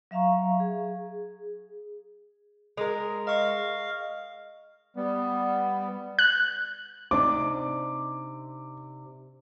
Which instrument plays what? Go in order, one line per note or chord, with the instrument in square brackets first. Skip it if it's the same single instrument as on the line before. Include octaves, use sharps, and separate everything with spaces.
[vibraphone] F#3 E5 F5 A#5 C#6
G#4
[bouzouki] G#3 A#4
[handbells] D#5 C#6 [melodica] F5
[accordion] G3 B3
[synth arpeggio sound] F#6
[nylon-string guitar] C3 D4 D#4 [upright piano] D6